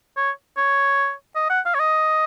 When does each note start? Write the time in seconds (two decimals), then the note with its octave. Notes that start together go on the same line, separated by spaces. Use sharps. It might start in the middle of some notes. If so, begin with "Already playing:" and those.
0.17 C#5
0.57 C#5
1.35 D#5
1.50 F#5
1.66 F5
1.74 C#5
1.79 D#5